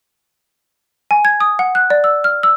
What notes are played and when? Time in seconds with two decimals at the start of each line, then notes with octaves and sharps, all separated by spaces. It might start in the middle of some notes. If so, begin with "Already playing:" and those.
1.11 G#5
1.25 G#6
1.40 D#6
1.59 F#5
1.75 F#6
1.90 D5
2.04 E6
2.24 F6
2.43 E6